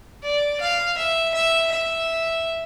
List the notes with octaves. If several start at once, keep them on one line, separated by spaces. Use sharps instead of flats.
D5
F5
E5
E5
E5